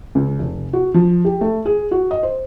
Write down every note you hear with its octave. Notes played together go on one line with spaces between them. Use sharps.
C#2
F1
F#4
F3
G4
A3
G#4
F#4
D#5
C5